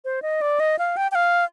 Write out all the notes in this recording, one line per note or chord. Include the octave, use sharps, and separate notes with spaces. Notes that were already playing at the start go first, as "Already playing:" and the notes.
C5
D#5
D5
D#5
F5
G5
G5
F5